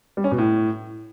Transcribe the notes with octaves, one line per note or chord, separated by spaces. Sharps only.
G3
C#4
B2
A2